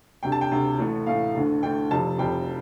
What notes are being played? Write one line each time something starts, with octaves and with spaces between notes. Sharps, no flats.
D2 C3 G3 G5
A5
G5
D2 C3 G3
A1 A2 A3
A1 A2 A3 F5
D2 D3 A3
D2 D3 A3 G5
F1 F2 C3 G3 A5
F1 F2 C3 G3 G5